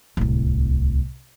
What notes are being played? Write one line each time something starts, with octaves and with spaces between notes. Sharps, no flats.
D1 C2